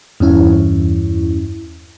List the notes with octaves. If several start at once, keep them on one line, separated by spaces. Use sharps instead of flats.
E2 G2 C#4 E4